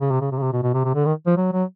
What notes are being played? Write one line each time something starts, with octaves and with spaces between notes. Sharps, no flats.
C#3
C3
C#3
C3
C#3
C3
B2
B2
C3
C3
D3
D#3
F3
F#3
F#3